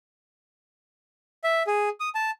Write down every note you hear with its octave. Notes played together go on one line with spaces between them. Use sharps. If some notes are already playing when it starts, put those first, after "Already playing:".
E5
G#4
D#6
A5